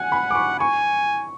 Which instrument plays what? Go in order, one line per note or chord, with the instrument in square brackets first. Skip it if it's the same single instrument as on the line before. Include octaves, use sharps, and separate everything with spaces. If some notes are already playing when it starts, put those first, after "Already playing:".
Already playing: [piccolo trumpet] F#5 [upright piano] G#5
[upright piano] B5
D6
C#6
[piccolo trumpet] G#5 [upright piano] C#6